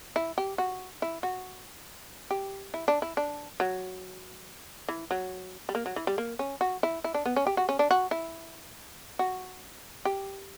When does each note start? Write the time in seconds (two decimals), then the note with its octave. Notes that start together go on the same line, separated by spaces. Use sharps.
0.16 E4
0.38 G4
0.58 F#4
1.02 E4
1.23 F#4
2.31 G4
2.74 E4
2.88 D4
3.02 E4
3.17 D4
3.60 F#3
4.89 E3
5.11 F#3
5.69 G3
5.75 A#3
5.86 F#3
5.96 E3
6.07 G3
6.18 A#3
6.39 C#4
6.61 F#4
6.83 E4
7.04 E4
7.14 D4
7.26 B3
7.36 C#4
7.47 G4
7.57 F#4
7.69 C#4
7.79 D4
7.91 F#4
8.11 E4
9.19 F#4
10.05 G4